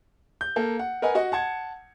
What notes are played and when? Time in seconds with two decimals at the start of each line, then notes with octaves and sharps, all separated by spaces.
0.41 G6
0.56 A#3 A4
0.79 F#5
1.02 A#4 B4 D#5 F#5 G#5
1.15 F#4 D#5 F#5
1.32 F#5 A5 G#6 C#7